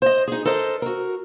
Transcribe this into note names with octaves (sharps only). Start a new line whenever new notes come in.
C5 D#5
D#4 G#4
A4 A#4 C5 D#5
F#4 A#4